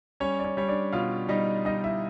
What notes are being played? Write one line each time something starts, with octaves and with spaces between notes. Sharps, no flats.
G3 C#4 C#5
D5
C#4 C#5
G3 C#5
D4 D5
B2 F4 F5
G3 D#4 D#5
G3 D#4 D#5
E4 E5